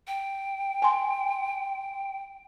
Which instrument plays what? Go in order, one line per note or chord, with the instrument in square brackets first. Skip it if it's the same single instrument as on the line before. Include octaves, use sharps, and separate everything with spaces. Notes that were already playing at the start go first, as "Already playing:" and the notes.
[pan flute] G5
[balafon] G#5 C6